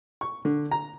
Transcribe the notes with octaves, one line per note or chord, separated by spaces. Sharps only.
C#6
D3
A#5